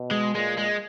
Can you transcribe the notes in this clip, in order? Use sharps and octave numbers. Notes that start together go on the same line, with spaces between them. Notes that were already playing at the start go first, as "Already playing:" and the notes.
Already playing: B2
G#3
A#2 G#3
G#3